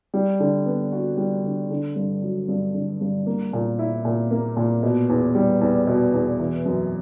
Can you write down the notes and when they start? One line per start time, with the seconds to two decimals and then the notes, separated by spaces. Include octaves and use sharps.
0.14 G3
0.40 D3
0.66 B3
0.92 F#4
1.17 G3
1.44 D3
1.70 D3
1.96 G2
2.22 F#3
2.48 G2
2.74 D3
3.01 G2
3.26 A#3
3.53 A#2
3.79 E4
4.05 A#2
4.31 A#3
4.56 A#2
4.83 B2
5.09 E2
5.35 G3
5.61 E2
5.87 B2
6.13 E2
6.39 E3
6.66 F#2